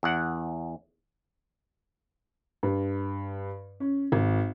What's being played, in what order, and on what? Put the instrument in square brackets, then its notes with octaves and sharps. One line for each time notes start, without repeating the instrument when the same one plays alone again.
[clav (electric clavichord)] E2 F#5
[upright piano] G2
C#4
G#1